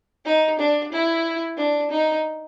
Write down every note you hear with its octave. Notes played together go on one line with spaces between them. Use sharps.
D#4
D4
E4
D4
D#4